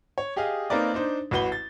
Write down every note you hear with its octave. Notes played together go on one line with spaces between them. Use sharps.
C#5
G4 G#4 D#5 F5
A#3 C4 D#4 A#4 B4 D5
D4 D#4 C5
A1 F#4 B4 F#5 G7
A6